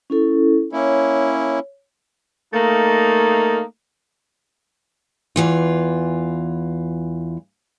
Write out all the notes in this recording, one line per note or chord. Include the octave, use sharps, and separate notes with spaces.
C#4 E4 A4
A#3 C#4 E4 C#5
A3 A#3 D#4
E2 E3 F4